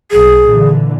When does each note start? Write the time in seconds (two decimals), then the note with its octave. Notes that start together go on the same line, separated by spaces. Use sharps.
0.12 B1 G#4
0.46 A#2 D3 E3